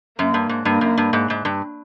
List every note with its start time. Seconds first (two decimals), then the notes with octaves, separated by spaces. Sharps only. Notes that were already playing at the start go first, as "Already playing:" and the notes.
0.19 F#2 A#3
0.34 G2
0.49 G#2
0.65 G2 A#3
0.81 F#2
0.98 G2
1.13 G#2
1.30 G#2
1.45 G2